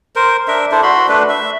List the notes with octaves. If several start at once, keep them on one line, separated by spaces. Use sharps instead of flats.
A#4 C5
D4 A#4 E5
D4 E4 A4 C5
F#4 B5 C6
A3 D4 B4
E5